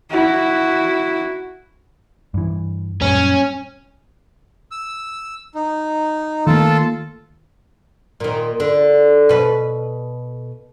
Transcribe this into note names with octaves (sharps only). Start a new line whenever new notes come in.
E4 F#4
G2 E3
F#2 A#2 G3 C#4
E6
D#4
D#3 A3 A#3 F4 A4 A5
A#2 D#3
D3
B2 B4